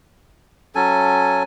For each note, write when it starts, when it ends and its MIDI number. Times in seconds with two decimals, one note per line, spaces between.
0.75 1.43 54
0.75 1.43 61
0.75 1.43 69
0.75 1.43 80